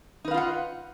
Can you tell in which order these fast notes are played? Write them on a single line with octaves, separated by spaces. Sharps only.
D#4 B4 F5 F4 F#5